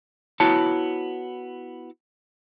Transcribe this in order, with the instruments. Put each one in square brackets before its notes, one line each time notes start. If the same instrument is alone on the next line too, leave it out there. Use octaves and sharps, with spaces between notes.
[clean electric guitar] B3 E4 F#4 C#5 A5